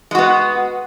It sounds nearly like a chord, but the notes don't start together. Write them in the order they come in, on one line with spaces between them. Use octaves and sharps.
G#3 F#4 B3